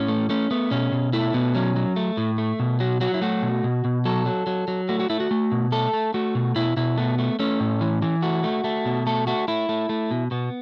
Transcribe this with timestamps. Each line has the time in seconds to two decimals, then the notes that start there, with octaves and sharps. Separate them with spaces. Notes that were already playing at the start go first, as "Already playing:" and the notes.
Already playing: A2 C#4
0.08 A3
0.30 A3 C#4
0.51 A3 B3
0.71 B2 C#4
0.92 B2
1.13 A3 E4
1.34 B2 B3
1.55 F#3 C#4
1.76 F#3
1.96 A3
2.17 A2
2.38 A3
2.60 B2
2.80 F#3 F#4
3.01 F#3 F#4
3.14 E4
3.22 A3 F#4
3.42 B2
3.64 B2
3.85 B2
4.05 F#3 A4
4.26 F#3
4.47 F#3
4.68 F#3
4.89 A3 F#4
5.00 F#4
5.10 A3 E4
5.20 F#4
5.31 A3
5.52 B2
5.72 A3 A4
5.93 A3
6.14 A3 F#4
6.35 B2
6.56 B2 E4
6.77 B2 E4
6.97 A3 B3
7.19 A3
7.39 A3 C#4
7.60 A2
7.81 E3
8.02 E3
8.22 A3 F#4
8.44 A3
8.64 A3
8.85 B2
9.07 A3 A4
9.27 A3 F#4
9.48 A3 E4
9.69 A3
9.89 A3
10.11 B2
10.31 B2 B3